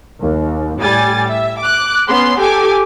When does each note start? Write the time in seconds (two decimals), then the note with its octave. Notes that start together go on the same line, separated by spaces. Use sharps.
0.19 D#2
0.79 A2 G3 G#5 A6
1.28 E5
1.60 D6 F#6
2.08 B3 C#4 C6
2.40 G4 A4 G#5 D6